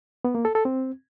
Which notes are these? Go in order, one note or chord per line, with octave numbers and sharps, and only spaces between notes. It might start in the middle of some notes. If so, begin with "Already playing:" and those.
B3
A#3
A4
A4
C4